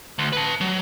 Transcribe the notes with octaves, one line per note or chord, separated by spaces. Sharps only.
D2
B4 A5
F#3